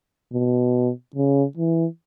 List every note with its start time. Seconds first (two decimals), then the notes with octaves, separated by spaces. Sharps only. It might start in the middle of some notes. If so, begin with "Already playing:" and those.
0.33 B2
1.15 C#3
1.57 E3